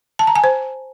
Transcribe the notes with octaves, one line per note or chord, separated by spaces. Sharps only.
A5
A#5
G#5
C5